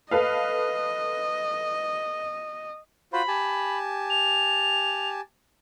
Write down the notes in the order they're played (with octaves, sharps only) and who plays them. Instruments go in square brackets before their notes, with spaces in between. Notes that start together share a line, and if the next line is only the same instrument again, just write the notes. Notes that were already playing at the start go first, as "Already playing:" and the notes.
[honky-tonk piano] A4 B4 F5 [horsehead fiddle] D#5
[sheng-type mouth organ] F4 F#4 C5 [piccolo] B5
[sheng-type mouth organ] G4 G#5 A5
[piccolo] F7